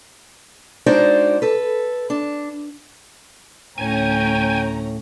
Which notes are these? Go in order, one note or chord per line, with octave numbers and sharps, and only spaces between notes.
G#3 D4 D#4 F#4 C5 D5
A4 B4
D4
D2 A2 C#4 G5 G#5 A#5